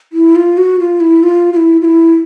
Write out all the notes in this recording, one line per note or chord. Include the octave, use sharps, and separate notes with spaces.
E4
F4
F#4
F4
E4
F4
F4
E4
F4
E4